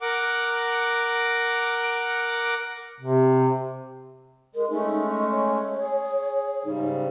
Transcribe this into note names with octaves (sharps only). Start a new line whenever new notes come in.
A#4 F#5 D6
C3
G#3 A#4
G#3 A3 C#4 D#4
D#5
C#5
G#4
G#2 C#3 G3 D#4